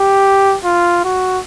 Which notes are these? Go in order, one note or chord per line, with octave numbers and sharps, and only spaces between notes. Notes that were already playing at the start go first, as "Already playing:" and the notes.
Already playing: G4
F4
F#4